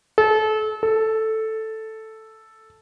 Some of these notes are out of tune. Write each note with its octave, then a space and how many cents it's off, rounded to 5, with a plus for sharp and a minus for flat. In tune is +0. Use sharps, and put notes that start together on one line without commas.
A4 -30
A4 +0